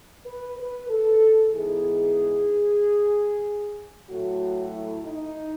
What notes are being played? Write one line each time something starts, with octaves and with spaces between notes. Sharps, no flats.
B4
B4
A4
G#2 E3 B3 D#4 G#4
A2 F#3 A3 F#4
E4
D#4